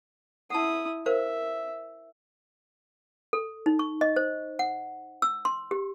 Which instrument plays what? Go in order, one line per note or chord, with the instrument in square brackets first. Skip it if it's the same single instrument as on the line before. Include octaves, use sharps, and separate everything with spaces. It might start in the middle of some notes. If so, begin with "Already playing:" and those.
[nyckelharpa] E4 D#6 [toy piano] F#5 A5
[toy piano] A#4 C5 F5 [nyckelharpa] E5
[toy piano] A4
D#4
C#6
D#5
C5
F#5
E6
C6
G4